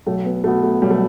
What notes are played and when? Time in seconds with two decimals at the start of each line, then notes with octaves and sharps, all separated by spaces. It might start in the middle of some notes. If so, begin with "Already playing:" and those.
0.06 B1 A3
0.25 B3
0.44 B2 A3 B3
0.63 A3
0.82 B1 G3
0.91 A3